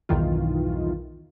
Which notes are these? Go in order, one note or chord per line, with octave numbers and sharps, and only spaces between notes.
B1 E2 G2 D#3 E3 F4